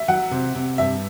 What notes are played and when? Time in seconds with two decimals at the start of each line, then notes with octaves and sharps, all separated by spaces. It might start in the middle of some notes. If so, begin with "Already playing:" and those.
Already playing: E5
0.08 F#3 F#5
0.31 C3
0.55 C3
0.78 G2 E5